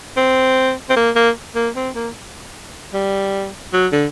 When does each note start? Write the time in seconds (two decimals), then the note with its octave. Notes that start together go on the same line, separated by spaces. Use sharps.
0.17 C4
0.90 C4
0.97 A#3
1.16 A#3
1.55 A#3
1.76 C4
1.95 A#3
2.94 G3
3.73 F#3
3.92 D3